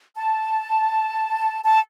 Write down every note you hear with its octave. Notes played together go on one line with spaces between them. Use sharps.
A5
A5